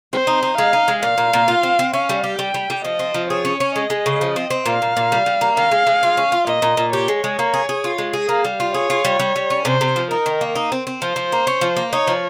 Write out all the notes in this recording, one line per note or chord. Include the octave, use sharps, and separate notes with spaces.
C4 C5
D#4
D#4
G#3 F5
D#4
G#3
A#2 F5
A#2
A#2
F4
C4
C4
C#4 F5
G3
G4
G3 G5
G3
G3
F3 D#5
C4
F3
G#4 C#5
C#4
C#4
G#3 D#5
G#3
C#3
F3
C4
C4
A#2 F5
A#2
A#2
G3
G3
A#3
D#3 F5
G#3
G#3
F4
C#4
F4
A#2 D#5
A#2
A#2
G4 C#5
G#3
G#3
A#3
G#4
G#4
F4
G#3
G#4
A#3 F5
G3
F4
G#4 C#5
F4
G3
G3
G3
C#4
C3 C5
C3
F3
D#4 A#4
D#3
A#3
D#4
C4
C4
F3 C5
F3
A#3
C#4
F3
A#3
D#4 C#5
F3